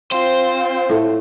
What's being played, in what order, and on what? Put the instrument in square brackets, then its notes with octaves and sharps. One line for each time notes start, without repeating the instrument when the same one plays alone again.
[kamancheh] C4 F4 [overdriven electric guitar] C5
[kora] A2 A3